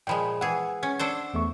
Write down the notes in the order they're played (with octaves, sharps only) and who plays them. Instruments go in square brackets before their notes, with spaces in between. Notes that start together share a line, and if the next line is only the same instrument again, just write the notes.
[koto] A#2 F3 G#3 [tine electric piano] G5 B5
[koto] E3 G#4 [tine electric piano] F#5
[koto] C#4
D4 A4 C5
[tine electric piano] E2 A3 C#6